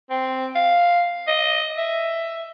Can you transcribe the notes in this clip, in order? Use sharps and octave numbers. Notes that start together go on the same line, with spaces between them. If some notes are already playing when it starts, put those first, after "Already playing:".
C4
F5
D#5
E5